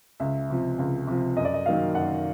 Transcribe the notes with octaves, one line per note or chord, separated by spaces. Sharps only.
C#2 E5
C3 F3
C#2
C3 F3
F#2 D#5
D5
D#5
D#3 F#3 A#3 F5
F#2 F#5